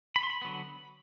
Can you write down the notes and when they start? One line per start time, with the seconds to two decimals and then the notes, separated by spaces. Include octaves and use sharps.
0.16 B5
0.23 C6
0.30 B5
0.42 D3 F#3 B3